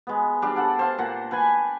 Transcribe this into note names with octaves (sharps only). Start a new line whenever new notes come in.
G#3 B3
G3 D4 G4
A4 F#5 A5
C5 F5 A5
A#2 F#5
B4 G5 G#5